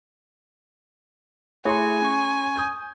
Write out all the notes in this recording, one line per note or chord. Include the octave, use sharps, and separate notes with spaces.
A3 E4 G#4 C#5 G#5 A#5 C6
C#4 C#6
D#6 G6 G#6